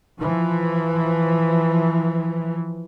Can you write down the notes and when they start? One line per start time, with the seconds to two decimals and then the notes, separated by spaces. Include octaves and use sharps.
0.17 E3 F3